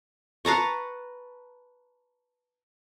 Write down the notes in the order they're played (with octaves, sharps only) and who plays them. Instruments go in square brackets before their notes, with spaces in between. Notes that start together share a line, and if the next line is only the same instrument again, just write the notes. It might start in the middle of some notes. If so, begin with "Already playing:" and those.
[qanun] B4 A5 A#5 C#6